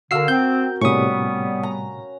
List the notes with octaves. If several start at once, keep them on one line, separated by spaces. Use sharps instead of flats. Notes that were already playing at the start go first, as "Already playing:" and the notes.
D3 F#4 A#4 F5 E6 C7
C4 G6
A2 C3 G3 B3 C#4 B4 C#6 D#6
A#5